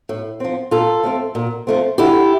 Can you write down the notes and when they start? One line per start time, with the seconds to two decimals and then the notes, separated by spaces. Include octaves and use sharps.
0.09 A2
0.40 F3 C4
0.71 A#2 F4 A4
1.04 F3 A3 C4
1.35 A#2
1.67 F3 A3 C4
1.98 D3 E4 G4